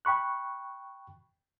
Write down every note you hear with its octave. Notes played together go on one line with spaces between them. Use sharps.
G5 B5 C#6 F#6